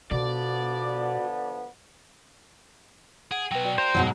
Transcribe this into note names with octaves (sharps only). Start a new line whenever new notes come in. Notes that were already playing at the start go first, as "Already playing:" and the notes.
B2 D3 F3 B3 F#4 D5
G#4 F#5 D7
B2 F#3 B4 G5
F#4 D5 G5
C5 F5 A#5
G#2 B2 F#3